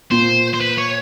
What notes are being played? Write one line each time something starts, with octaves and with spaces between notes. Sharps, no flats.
A#2 C5
C5
B4
C#5